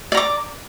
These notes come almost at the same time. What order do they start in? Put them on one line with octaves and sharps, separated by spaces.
D5 A#5 D6